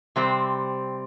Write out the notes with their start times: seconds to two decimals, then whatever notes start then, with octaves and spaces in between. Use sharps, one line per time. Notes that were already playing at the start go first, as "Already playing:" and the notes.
0.16 C3 G3 C4